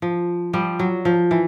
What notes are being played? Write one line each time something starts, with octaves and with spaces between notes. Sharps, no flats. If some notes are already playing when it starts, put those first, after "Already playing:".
F3
F3 G3
F#3
F3
E3